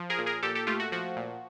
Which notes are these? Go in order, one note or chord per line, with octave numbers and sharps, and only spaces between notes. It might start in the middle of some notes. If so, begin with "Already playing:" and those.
Already playing: F3
G#4 A#4
A#2
G#4 A#4
A#2 G4 A4
G4 A4
A3 F4 G4
F#4
F3 F#4
A#2